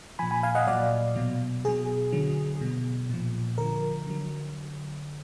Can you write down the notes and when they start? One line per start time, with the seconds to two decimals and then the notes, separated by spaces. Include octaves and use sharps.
0.19 A#2 F3 G#5 B5
0.31 G#5 B5
0.43 F5 G#5
0.55 D#5 F#5
0.67 A#2 F#3 D5 F5
1.16 B2 F#3
1.65 B2 F#3 G#4
2.12 D3 F#3
2.61 B2 F#3
3.09 A#2 F3
3.58 D3 F3 A#4
4.06 D3 F#3